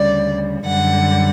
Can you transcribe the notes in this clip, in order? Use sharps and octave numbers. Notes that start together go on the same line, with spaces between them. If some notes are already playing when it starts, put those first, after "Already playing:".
Already playing: D2 C#3 G3 D5
F#2 D3 G3 F#5